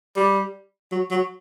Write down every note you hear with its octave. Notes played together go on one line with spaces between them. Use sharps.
G3
F#3
F#3